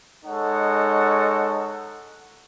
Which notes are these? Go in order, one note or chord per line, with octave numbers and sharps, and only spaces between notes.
G#3 D#4 A4 C#5 F#5